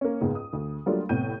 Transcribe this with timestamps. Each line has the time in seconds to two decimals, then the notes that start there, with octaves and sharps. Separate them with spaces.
0.01 A#3 C#4
0.21 C#2 G#2 B3 G#4
0.35 D#6
0.53 D2
0.86 F#3 G3 A3 A#3 D4 F4
1.09 C2 A2 B3 G6 D#7